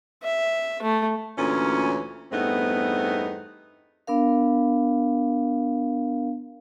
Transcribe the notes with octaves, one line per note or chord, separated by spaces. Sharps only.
E5
A3
D2 A#2 E3 C#4
E2 G2 A3 B3 C4 D#4
B3 D4 A#4 F5